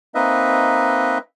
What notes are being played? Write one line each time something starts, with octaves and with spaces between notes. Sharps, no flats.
A#3 C4 D#4 B4 D#5 E5